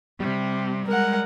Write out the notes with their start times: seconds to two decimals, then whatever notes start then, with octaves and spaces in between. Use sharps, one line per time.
0.20 C3 G3
0.87 G#3 A#4 F#5